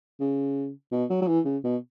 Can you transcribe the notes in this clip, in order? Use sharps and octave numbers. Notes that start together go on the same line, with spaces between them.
C#3
B2
F#3
F#3
E3
C#3
B2